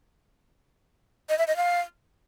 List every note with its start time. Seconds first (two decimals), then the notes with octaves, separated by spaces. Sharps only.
1.29 D#5
1.38 E5
1.48 D#5
1.57 F5